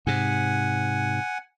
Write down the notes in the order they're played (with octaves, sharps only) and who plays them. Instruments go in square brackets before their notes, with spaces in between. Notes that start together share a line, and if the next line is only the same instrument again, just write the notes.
[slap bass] G#2 C3 [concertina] F#5 G#5